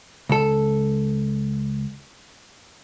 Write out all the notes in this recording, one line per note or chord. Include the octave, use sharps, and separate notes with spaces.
C#2 A4